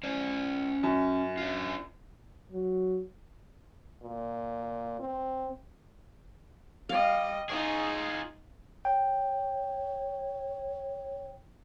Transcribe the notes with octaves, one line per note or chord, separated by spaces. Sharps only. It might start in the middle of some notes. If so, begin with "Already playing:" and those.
C#4 C5 D5
F#2
D4 F4
F#3
A#2
C4
G3 D#5 F5
D#4 F4 G#4
C#5 G5